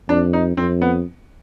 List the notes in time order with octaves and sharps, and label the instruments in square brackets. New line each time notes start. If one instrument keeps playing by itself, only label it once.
[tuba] F2 [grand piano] D4
[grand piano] D#4
[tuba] F2 [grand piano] C4
[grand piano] B3